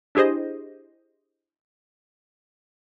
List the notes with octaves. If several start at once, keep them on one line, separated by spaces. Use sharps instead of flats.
D4 E4 G4 G#4 C5 D#5